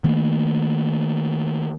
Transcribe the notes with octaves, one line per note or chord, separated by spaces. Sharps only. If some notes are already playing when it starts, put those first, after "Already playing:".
D#3 A3 A#3